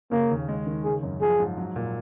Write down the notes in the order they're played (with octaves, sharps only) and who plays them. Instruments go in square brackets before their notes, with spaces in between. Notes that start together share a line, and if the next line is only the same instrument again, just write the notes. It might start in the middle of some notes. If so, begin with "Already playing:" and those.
[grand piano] C#3 [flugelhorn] A#3
[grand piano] D#2
G#3
D#3
[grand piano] C#3 [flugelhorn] G#4
[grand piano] F#2
[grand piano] F3 [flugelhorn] G#4
[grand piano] G#2
F#3
A#2